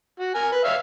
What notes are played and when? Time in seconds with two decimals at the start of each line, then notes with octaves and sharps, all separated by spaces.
0.19 F#4
0.35 A#4 G#5
0.52 B4
0.65 C#5 E5 F5